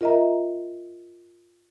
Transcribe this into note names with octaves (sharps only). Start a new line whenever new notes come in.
F4 A#4 D#5 E5 A#5